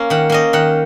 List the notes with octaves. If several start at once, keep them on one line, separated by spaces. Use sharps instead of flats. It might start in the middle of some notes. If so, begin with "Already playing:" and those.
Already playing: A#3 C#4
D#3 F#5
A#3 C#4 D#5
D#3 F#5